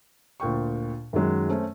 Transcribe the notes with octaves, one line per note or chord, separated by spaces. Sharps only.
D2 A#2 G5 C#6
F#2 D#3 F#3 G#3
A3 C4 C#4